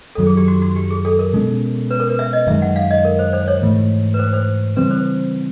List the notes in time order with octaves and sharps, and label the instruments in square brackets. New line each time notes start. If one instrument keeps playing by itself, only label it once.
[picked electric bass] F#2 D#3 F#3 [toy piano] A4
[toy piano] G#4
G4
F#4
F#4
G4
G#4
A4
A#4
[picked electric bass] B2 G#3 C#4
[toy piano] B4
A#4
B4
E5
D#5
[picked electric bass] F#2 D#3 G#3 [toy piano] E5
[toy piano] F#5
F5
D#5
A#4
C5
C5
C#5
[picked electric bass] G#2 E3 A3
[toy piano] B4
C5
C5
[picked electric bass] C#3 E3 G3 C4 [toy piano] B4
[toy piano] C5